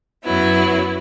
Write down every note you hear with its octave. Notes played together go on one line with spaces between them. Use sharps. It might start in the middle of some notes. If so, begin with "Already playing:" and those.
F#2 F#3 B3 E4